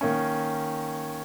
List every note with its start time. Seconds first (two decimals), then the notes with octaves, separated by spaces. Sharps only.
0.01 D#3 A#3 C#4